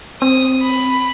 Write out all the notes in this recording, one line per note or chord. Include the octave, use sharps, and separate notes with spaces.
C4 D#6
B5